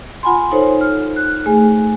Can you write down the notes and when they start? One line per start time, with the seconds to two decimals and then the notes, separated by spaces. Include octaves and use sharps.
0.23 F4 F#5 G#5 B5 C6
0.51 D#4 A4 C5 C#5
0.81 F6
1.16 F#6
1.46 A3 G#4 G#5